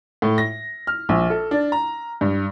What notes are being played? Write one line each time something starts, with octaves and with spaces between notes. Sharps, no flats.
A2
A#6
F6
A#1
A4
D4
A#5
G2